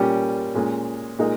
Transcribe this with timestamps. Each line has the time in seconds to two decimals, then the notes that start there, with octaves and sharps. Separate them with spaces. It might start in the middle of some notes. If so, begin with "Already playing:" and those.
Already playing: A#2 G3 A#3 C#4 G4
0.54 A#2 G#3 C#4
1.19 A#2 G#3 D#4 A#4 D#5